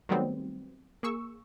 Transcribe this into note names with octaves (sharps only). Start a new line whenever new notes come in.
D#3 F#3 G3 A3 B3 C4
A#3 G#4 C#6 E6